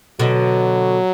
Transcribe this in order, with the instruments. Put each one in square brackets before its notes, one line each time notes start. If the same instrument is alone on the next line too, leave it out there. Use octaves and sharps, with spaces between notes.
[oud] B2 D3 [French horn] F#3